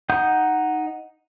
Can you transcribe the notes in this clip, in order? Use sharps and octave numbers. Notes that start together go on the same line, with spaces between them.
D#4 F#5 D#6 G6